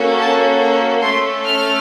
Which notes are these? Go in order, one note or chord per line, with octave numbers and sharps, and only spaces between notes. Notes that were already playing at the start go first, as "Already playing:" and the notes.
Already playing: A#3 C#4 F#4 A4
A5
A#5
A3 C#4 A4 C6
F6